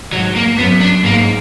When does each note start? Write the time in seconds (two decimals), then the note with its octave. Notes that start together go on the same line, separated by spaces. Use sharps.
0.13 G#2 F#3
0.36 A#3
0.58 F#2 B3
0.81 D4
1.04 G#2 A#3